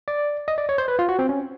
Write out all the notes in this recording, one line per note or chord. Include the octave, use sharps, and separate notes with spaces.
D5
D#5
D5
C#5
C5
B4
F4
F#4
C4
C#4